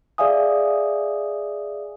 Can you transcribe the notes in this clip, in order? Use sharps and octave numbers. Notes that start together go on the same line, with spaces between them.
G#4 D5 E5 F5 G#5 D#6